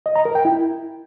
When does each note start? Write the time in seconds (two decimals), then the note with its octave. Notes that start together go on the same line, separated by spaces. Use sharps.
0.06 D#5
0.16 A#5
0.25 A#4
0.35 G5
0.45 E4